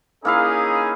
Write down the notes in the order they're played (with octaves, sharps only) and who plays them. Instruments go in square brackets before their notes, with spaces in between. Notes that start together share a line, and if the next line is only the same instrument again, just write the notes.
[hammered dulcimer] A#3 E4 F5 [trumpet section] C#4 D#4 G#4